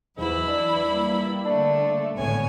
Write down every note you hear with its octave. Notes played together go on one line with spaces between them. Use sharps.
E2 G#2 E3 F#3 E4 B4 B5
E3 D4
G3 A#3
D3 A3 D4
G#1 A2 D3 B3 C#5 G#5